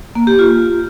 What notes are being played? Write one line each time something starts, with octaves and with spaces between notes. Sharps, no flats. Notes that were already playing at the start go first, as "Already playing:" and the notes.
A#3
G4
F4